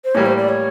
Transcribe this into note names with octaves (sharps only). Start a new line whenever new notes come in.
C5
A2 E3 G3 A#3 C#5
C5
D5
C#5